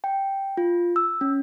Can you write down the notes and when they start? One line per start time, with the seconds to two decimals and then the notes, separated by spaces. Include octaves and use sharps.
0.04 G5
0.57 F4
0.96 E6
1.21 C#4